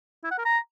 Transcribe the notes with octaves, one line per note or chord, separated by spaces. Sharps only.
E4
F#5
A#4
A#5